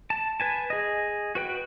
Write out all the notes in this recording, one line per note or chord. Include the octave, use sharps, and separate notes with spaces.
A5
B4 G#5 A5
G#4 D#5
F#4 B4 G5